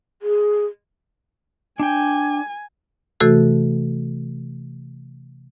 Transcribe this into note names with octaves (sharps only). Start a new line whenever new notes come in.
G#4
D4 G5 G#5
C3 E3 A3 F#4 A4